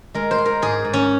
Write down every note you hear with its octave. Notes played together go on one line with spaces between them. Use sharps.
G#3 A#4
C5
G#3
A#4
G#2 G#4
G#2
C#4